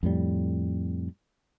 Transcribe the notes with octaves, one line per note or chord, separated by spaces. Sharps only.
F2 A2 G3